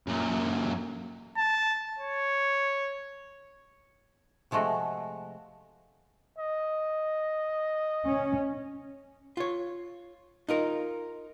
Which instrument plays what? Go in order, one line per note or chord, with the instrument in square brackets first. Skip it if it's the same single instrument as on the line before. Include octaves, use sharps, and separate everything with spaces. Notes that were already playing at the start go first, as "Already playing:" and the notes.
[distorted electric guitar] F#2 A#2
[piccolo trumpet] A5
C#5
[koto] C3 F3 G#3 A3 F#4
[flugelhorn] D#5
[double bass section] C#4
[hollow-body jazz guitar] F4 C#5
D#4 F4 A#4